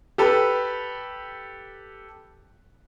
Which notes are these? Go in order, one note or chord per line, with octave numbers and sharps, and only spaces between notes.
G4 A4 B4